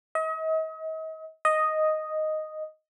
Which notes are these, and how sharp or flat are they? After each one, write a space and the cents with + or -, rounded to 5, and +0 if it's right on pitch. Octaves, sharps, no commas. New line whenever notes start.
D#5 +40
D#5 +0